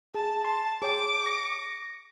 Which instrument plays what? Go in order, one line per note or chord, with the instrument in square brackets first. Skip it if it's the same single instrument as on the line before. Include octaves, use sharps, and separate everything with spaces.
[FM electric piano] G#4 [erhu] A5
[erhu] A5 [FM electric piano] C6
[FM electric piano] G#4 C#5 G5 [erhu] D6
[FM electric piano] A#6 C#7